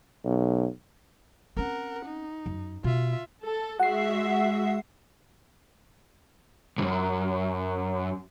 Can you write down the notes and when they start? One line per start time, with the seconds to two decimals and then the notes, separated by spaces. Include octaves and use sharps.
0.25 B1
1.57 C4 C#4 A#4 F#5
2.06 D#4
2.46 F#2
2.84 B2 F4 E5
3.43 A4
3.80 G#3 F#4 E5 F#5 C7
6.78 C2 F#2